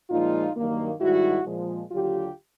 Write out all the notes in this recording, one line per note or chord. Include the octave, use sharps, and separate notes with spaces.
A#2 F3 G#3 D#4 F4
G2 D#3 F#3 A#3
G#2 D#3 G3 E4 F#4
A#2 F3 G#3
D#2 D3 F#3 F4 G4